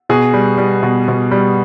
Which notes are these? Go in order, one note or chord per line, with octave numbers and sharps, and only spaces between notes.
B2 G#4
G3
G3
B2
B2
G3